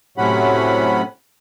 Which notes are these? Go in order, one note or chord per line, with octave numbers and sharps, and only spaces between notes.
A2 C3 F#3 C#4 F#5 B5